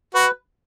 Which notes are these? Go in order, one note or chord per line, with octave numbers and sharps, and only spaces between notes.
F#4 B4